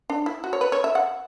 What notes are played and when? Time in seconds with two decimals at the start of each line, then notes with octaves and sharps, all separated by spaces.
0.10 D4
0.26 E4
0.44 F#4
0.53 C#5
0.61 B4
0.72 C#5
0.84 E5
0.95 F#5